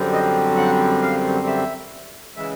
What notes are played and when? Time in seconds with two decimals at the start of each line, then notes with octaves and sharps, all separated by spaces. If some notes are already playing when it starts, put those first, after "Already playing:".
Already playing: F#2 D3 G3 C4
0.13 D#5
0.57 F#5
1.02 F5
1.46 E5
2.37 C#3 E3 G#3 E5